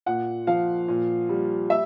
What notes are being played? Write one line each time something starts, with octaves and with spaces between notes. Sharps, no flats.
A#2 F#5
F3 F5
A#2
G3
E5